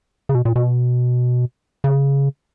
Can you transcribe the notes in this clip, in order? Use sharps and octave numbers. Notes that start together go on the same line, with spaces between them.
C#3
B2
A#2
B2
C#3